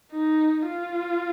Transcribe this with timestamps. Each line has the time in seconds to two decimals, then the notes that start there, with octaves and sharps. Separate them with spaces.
0.12 D#4
0.68 F4